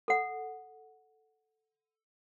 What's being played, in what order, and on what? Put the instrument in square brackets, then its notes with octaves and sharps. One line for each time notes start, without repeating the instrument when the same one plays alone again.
[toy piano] A4 F#5